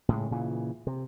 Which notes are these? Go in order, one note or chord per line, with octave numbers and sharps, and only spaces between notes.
A2 C#3 G#3
A#2 C#3 E3
C3